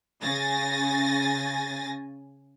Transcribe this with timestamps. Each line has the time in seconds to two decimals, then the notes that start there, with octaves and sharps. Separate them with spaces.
0.22 C#3 G#5 A6 A#6